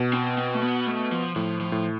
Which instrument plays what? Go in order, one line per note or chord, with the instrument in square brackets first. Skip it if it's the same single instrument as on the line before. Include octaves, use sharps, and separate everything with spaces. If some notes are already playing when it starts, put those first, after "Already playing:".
Already playing: [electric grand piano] B2
[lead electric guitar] C4
C4
A3
B3
A3
F3
[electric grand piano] A2 [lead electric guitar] F3
[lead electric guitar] F3
[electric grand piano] A2